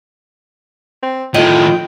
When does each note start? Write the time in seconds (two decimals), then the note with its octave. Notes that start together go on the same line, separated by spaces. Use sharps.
1.03 C4
1.34 A2 D#3 F4 D#5 G5